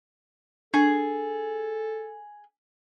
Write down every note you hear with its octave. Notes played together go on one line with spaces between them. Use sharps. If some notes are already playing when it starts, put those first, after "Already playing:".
D4 G#4 A4